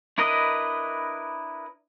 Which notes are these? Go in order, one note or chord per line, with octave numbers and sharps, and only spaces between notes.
D4 E4 A#4 B4 D#5